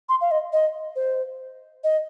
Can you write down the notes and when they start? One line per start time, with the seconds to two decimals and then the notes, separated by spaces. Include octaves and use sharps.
0.09 C6
0.21 F5
0.31 D#5
0.53 D#5
0.96 C5
1.84 D#5